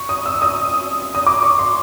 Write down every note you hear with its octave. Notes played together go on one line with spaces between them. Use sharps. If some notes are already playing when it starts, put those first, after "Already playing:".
Already playing: C#6
D#6
E6
D#6
D#6
D6
C#6
C6